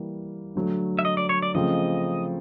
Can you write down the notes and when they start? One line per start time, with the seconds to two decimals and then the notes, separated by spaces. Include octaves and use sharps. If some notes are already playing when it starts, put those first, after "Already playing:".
Already playing: E3 G3 A#3
0.55 D3 F#3 A3
0.99 E5
1.05 D#5
1.17 D5
1.29 C#5
1.42 D5
1.55 C#3 F3 A3 C4 D#5